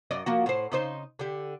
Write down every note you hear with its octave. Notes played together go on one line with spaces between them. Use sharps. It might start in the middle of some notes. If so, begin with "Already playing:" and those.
F#2 D5 D#5
F3 A#3 F#4
A2 C5
C#3 D#4 C5
D3 G4